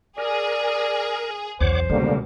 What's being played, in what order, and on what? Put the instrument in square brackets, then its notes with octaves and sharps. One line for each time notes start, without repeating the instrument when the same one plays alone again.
[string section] G#4 [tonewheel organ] A#4 [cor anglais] D5
[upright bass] B1 E2 [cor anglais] C5 [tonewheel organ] C#5 F#5 D6
[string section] C#2 B2 [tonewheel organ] D3 G3 A#3 [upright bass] D4